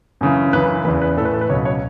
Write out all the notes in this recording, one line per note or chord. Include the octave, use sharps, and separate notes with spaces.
F#2 C#3 E3
F#2 C#3 E3 B4
E2 C#3 E3 B4
B4
A2 E3 A4 B4
A4
B4
C#2 B2 F#3 C#5
C#5